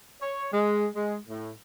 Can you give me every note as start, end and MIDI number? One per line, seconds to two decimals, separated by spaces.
0.21 0.46 73
0.52 0.86 56
0.95 1.15 56
1.27 1.51 45